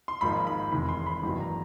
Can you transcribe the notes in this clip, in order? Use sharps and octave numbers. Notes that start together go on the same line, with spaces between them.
C6
G#1 G#2 F3 A#3 D#4 B5
B5
F1 E2 C3 D#3 G#3 B5
C6
B5
A1 G2 D#3 F#3 B3
A#5